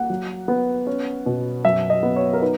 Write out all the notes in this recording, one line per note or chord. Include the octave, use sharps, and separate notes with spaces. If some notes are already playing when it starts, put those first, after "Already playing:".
Already playing: A#3 F#5
F#3
B3
C#4
B2
F#2 E5
D#5
B3
C#5
A#4
D#4 B4